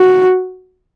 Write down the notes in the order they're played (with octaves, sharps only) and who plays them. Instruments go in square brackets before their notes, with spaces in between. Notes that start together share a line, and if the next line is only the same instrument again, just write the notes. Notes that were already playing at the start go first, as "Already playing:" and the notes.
Already playing: [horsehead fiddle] F#4